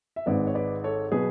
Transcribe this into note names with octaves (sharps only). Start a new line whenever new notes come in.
E5
G#1 G#2 G#3 B4 D5
C#5
B4 D5
A4 C#5
B2 F#3 G#4 B4